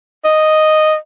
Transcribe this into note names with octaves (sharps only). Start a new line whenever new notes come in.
D#5